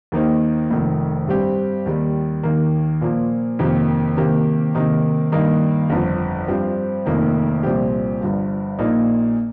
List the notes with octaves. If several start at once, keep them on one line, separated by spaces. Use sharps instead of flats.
D#2 D#3 A#3 D#4 C5
F1 F2 D#3
G2 G3 C4 G4
D#2 D#3 G3
D#2 D#3 A#3
A#2 F3 A#3
F2 C3 D#3 A#3 G4
C3 D#3 A#3 G4
C3 D#3 A#3 D#4
G2 D#3 A#3 D#4
G1 F2 F3
G2 F3 C4 G4 C5
F1 F2 D#3 A#3 D#4
C2 A#2 F3 C4 G4
G1 G2 F3
A#1 A#2 A#3 D#4